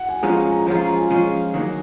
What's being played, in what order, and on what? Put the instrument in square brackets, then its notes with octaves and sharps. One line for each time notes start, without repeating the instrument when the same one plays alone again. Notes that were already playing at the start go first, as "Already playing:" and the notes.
Already playing: [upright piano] F#5
G#5
[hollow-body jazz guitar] F3 G#3 C#4 F4 [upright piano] A#5
[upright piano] G#5
A#5
[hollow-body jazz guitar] F3 G#3 C#4 F4 [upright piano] A#5
[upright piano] A#5
G#5
[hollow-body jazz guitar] F3 G#3 C#4 F4
D#3 F#3 A#3